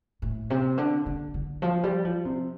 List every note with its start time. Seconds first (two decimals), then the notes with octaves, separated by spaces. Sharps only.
0.22 A2
0.50 C3
0.78 D3
1.06 D3
1.34 D3
1.62 F3
1.83 G3
2.05 F3
2.25 C3